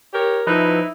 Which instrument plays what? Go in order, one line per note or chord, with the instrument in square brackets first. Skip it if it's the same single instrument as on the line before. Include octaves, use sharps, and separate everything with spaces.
[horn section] G4 A#4 C#5
[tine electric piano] F3 B4 [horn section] D#4 E4